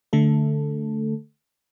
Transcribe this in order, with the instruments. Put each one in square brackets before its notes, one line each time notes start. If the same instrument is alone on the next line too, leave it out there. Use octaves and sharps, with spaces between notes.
[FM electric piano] D3 A3 A4